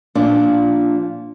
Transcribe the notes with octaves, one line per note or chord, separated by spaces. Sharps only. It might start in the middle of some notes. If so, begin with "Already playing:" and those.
A#2 F3 D4